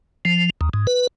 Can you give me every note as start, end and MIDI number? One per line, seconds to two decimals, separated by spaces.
0.25 0.50 53
0.61 0.69 39
0.74 0.87 44
0.87 1.07 71